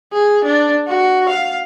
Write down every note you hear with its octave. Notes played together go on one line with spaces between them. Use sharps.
G#4
D4
F#4
F5